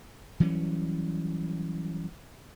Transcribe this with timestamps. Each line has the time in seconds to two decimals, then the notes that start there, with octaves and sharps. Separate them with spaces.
0.40 E3 F#3 G3 C#4